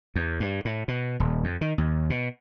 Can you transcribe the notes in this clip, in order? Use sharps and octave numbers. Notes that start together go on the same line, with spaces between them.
E2
G2
A2
B2
D#1
F2
D#3
D#2
B2